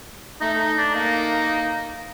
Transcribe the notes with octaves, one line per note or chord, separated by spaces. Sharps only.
A3 D#4
D#4
D4
A#3 D#4